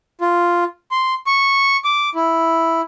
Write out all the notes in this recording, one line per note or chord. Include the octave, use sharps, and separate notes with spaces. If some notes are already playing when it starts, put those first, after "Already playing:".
F4
C6
C#6
D6
E4